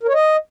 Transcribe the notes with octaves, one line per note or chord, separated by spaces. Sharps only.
A#4
C#5
D#5